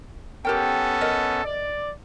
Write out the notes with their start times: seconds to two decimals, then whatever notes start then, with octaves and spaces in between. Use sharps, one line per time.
0.45 B3 C#4 G4 A4 A#4 G5
1.01 A#4 D#5
1.44 D5